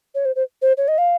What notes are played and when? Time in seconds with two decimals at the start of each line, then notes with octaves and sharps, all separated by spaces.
0.15 C#5
0.25 C5
0.36 C5
0.62 C5
0.77 C#5
0.88 D#5
0.98 F5